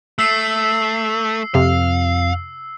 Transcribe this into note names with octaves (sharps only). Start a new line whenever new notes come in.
A3 E6 C7
F2 C3 F5